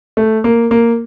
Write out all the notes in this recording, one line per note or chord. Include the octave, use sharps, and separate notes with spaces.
A3
A#3
A#3